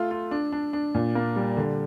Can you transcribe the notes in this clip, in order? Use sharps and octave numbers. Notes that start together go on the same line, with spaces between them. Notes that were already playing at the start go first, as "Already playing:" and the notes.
Already playing: A3 F4
F4
D4
D4
D4
A#2
A#3
G3
D3